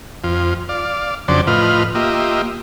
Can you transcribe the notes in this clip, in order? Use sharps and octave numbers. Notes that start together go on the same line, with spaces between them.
F2 F4
D5 F5
F2 C#3 F#3 D4 C5 D5
A2 F3 F4 B4 D#5 F6
A#3 F4 G4 D#5 E5